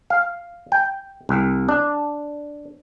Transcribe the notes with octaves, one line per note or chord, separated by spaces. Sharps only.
F5
G5
C2
D4